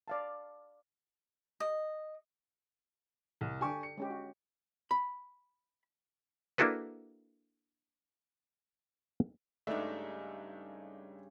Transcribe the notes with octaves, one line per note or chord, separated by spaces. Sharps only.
D5 F5 A5
D#5
C2
D3 D4 G4 G#5 C#6
C#7
G#3 C#4 G4
F#4
B5
A#3 D4 E4 F#4 A4 B4
G2 C#3 G#3 A3 D4 D#4 E5